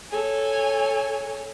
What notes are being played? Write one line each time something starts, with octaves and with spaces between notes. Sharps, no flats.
A4 C#5 G#5